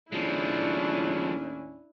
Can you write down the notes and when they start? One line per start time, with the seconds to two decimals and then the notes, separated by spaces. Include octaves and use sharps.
0.12 D#2 A2 F3 G#3 C#4 D4 E4